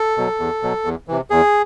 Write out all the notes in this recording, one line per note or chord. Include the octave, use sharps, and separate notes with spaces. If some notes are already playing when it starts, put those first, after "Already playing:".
Already playing: A4
B2 F#3
E2
B2 F#3
E2
C3 E3
E2 G#4